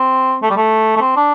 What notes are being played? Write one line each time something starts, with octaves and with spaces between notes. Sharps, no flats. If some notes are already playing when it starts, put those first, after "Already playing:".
Already playing: C4
A3
G3
A3
A3
C4
D4